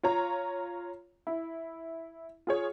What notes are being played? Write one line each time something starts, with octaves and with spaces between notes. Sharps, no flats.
F4 C#5 A#5
E4
F4 G#4 C#5